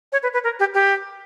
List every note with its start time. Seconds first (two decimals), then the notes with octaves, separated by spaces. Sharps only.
0.12 C#5
0.23 B4
0.33 B4
0.44 A#4
0.60 G4
0.74 G4